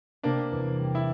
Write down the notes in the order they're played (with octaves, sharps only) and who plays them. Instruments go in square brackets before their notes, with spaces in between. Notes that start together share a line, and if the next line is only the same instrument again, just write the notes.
[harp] C3 [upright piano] A#3 D4
[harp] E2
G3
[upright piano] E4